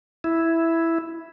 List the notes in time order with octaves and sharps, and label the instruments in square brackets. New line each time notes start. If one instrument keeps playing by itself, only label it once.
[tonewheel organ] E4